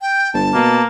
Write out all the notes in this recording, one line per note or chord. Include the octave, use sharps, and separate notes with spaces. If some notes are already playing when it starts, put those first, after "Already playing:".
G5
G1 A5
B2 A#3